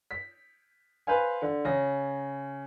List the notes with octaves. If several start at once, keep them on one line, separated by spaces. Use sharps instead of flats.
B6
B4 C5 F5 G#5
D3
C#3 A#6